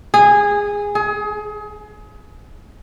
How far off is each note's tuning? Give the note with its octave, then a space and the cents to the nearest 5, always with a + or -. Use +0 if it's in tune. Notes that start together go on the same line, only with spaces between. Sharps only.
G#4 -15
G#4 +30